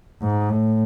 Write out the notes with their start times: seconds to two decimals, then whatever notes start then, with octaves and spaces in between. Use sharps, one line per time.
0.22 G#2
0.50 A2